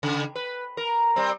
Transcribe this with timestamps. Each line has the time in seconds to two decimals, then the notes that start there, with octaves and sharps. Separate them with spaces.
0.03 C#3
0.35 B4
0.77 A#4
1.16 G3 C4